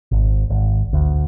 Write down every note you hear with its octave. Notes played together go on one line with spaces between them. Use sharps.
G#1
G#1
D2